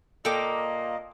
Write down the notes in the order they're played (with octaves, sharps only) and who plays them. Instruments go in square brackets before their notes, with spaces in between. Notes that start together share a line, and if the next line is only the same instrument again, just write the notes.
[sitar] A#2 A#3 [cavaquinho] A4 G5 D6 [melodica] D#5